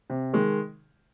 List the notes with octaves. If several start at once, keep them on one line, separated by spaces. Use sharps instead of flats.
C3
D#3 G#3